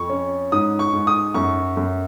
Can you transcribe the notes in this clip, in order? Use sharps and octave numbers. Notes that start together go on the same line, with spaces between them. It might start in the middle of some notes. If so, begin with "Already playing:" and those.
Already playing: F2 C#6
C#4
G#2 D#6
C#6
G#2
D#6
F#2 C#6
F#2